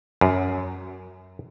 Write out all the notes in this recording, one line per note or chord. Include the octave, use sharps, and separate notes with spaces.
F#2